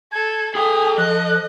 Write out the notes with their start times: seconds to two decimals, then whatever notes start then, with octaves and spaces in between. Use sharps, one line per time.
0.12 A4 G#6
0.55 G#4 A4 G5 G#5 D#6
0.98 F3 D#5 F#6